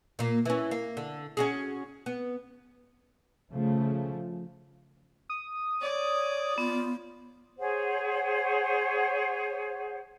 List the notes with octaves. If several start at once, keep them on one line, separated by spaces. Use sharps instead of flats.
A#2 A#3
E3 C#4
A#3
D3
C#4 F#4 G#4
B3
C#3 F3 A3
D#6
C#5 D5
B3 F4
G#4 C5 C#5 F#5